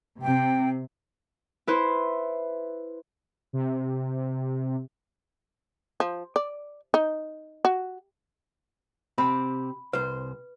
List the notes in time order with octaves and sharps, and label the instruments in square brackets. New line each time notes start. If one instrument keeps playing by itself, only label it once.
[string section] C3 [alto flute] G5
[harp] E4 B4 C5
[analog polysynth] C3
[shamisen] F3
D5
D#4
F#4
[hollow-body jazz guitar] C3 C4 G4 [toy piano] B5
[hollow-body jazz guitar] C2 C5 [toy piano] B4